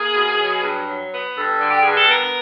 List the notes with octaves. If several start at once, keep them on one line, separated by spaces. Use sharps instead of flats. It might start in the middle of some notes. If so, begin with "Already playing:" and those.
Already playing: A#3 G#4
B2
F#3
G2
F#3
B3
G2 A4
D3
G4
G2 G#4
A4
B3 A#4